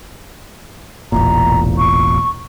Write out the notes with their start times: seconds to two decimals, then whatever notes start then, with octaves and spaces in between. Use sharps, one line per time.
1.12 E1 A1 A#2 A#5
1.78 C#6